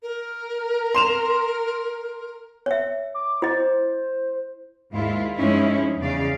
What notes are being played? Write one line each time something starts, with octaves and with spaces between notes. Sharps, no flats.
A#4
C6 E7 F7
C#5 E5
D6
E4 C5 D#5
D#2 G#2 E4 F4
G2 F3 G#3 C#4 D#4 E4
E2 C#3 D5 F5